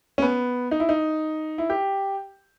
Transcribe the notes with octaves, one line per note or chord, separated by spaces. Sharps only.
C#4
B3
D#4
E4
D#4
E4
G4